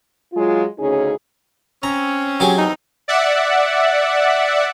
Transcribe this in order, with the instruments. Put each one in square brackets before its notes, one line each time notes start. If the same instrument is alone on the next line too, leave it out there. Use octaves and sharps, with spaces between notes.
[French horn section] F#3 G#3 F4
D2 C#3 C#4 D#4 G#4
[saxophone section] C4 C#4 [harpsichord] A#5
[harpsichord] F#3 G4 G#4
[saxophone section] E2 C4 D#4
[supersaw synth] D5 E5 F#5